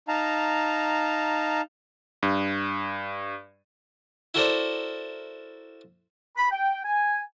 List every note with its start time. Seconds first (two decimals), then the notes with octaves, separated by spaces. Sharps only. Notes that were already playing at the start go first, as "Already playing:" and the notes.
0.08 D#4 F5 A5 A#5
2.23 G2
4.34 E4 F#4 A4 A#4 C5 D5
6.37 B5
6.51 G5
6.85 G#5